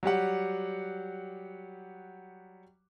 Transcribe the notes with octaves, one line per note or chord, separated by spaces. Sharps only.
F#3 G3 G4 F#5